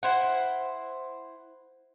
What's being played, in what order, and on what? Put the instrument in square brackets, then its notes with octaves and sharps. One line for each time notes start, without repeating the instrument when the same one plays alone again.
[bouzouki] E4 C5 F#5